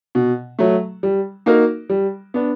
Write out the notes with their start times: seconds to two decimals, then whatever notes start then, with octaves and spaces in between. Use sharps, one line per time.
0.15 B2
0.59 F#3 A3
1.03 G3
1.46 A#3 D#4 F#4 A#4
1.90 G3
2.34 B3 D4